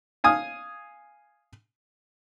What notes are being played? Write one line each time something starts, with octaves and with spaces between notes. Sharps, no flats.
F5 G#5 D#6